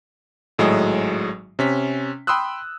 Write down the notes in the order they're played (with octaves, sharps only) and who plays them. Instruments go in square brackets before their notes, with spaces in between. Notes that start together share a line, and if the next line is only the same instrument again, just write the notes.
[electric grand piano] G#1 A2 F#3 G#3 D#5
C3 C#4 B6
G5 B5 C6 D#6 E6 F#6